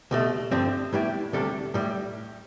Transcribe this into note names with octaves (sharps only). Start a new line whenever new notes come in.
C2 B2 A3
G2 D3 F3 C4
A2 G3 B3 E4 G4
D2 C3 G3 D4 A4
A2 G3